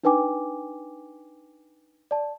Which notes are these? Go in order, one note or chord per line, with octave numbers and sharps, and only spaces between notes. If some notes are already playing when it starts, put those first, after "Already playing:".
D4 D#4 B4 G5 G#5 D6
D5 A5